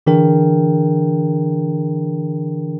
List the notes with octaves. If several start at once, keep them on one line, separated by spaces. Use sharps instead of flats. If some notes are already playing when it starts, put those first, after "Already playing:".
D3 E3 D4 G#4 A#4 G5